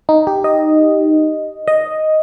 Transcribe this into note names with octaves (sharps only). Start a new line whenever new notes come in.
D#4
G4
D#5
D#5